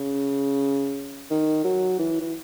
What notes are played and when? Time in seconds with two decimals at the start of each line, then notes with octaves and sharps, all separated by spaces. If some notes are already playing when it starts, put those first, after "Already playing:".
Already playing: C#3
1.30 D#3
1.64 F#3
1.99 E3
2.21 E3